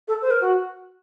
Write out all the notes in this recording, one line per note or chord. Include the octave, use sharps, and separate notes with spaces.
A4
C5
A#4
F#4